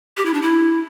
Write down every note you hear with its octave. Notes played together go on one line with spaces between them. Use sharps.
G4
E4
D4
E4